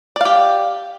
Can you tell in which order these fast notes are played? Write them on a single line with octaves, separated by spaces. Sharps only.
D5 F5 G4